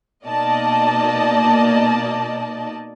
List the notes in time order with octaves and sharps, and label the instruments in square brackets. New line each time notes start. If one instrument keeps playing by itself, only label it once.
[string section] B2 A#3 D#4 D5 D#5 A5